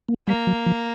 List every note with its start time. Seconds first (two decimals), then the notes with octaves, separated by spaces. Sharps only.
0.09 A#3
0.28 G3 A#3
0.47 F#3
0.66 F3